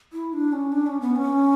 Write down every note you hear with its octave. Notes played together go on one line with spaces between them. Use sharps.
E4
D4
C#4
D4
C#4
B3
C#4